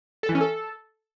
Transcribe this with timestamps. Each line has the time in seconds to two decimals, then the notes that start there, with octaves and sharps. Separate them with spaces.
0.23 A4
0.29 E3
0.35 C#4
0.41 A4